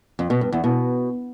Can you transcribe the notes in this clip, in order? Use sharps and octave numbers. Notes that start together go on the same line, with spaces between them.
F2
B2
G2
E2
B2